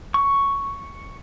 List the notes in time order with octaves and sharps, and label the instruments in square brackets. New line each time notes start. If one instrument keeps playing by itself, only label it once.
[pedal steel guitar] C#6